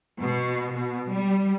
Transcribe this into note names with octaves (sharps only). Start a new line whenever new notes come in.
B2
B2
G3